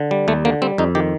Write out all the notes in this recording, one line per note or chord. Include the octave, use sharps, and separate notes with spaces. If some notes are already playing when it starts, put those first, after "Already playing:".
Already playing: D3
G3
D#2 A3
D3 A#3
G3 C4
F2 D#4
D#3 G4